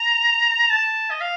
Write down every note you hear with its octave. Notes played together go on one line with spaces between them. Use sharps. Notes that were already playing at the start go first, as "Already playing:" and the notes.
Already playing: A#5
A5
D#5
F5